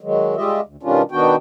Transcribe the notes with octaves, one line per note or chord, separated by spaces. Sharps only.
D#3 F#3 G#3
G3 G#3 F4 G4 D#5 E5
D2
B2 D#3 G3 C#4 D4 F4
B2 D#3 B3 D4 F#4 G5